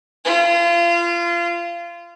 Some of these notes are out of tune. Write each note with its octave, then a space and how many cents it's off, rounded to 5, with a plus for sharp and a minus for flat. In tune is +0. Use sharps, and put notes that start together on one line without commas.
F4 -30